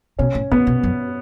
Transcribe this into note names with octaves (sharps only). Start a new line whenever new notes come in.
B2 C#4
A2
A2 B3
B2
F#2